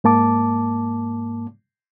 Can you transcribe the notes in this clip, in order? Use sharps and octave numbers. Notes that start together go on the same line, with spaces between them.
G#2 A#3 A5 D6